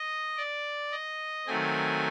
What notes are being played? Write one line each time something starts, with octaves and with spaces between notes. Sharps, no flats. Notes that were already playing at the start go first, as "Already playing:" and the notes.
Already playing: D#5
D5
D#5
D#3 F#3 A3 C4 G#5